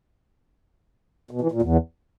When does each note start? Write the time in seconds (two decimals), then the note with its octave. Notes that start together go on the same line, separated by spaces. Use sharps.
1.31 B2
1.41 E3
1.52 A#2
1.62 E2